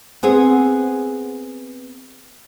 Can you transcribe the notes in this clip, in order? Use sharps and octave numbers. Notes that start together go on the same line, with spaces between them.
B3 C4 G#4